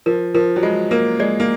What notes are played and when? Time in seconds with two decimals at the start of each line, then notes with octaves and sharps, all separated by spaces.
0.06 F3 A#4
0.34 F3 A#4
0.56 F#3
0.63 G#3 F4
0.91 A#3 A#4
1.19 G#3 D5
1.40 A#3